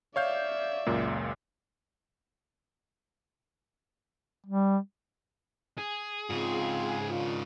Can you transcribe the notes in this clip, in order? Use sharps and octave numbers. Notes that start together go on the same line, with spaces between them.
C#5 D5 E5 F5 G6
C#2 F#2 A#2
G3
G#4
G#2 C#3 C4 F4
D#3 D4 F4